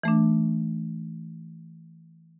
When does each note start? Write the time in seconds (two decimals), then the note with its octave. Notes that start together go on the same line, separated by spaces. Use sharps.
0.03 E3 A3 D4